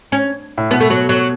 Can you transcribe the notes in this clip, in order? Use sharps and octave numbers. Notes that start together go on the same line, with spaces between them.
C#4
A2
B2 B3
A3
F#3
F#3